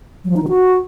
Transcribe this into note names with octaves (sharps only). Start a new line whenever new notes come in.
F#3
F3
D#4
D#3
F#4